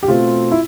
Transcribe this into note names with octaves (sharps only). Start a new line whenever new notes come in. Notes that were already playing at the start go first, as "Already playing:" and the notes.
G4
B2 A3 C4 F4
E4